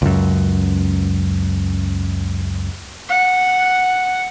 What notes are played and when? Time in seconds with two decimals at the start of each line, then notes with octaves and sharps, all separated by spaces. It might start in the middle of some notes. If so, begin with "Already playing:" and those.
0.02 C#2 F#2
3.09 F#5